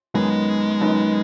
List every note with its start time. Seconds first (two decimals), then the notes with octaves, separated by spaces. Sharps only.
0.14 F#2 D#3 G#3 B3 D#4
0.81 F#2 D#3 B3 D#4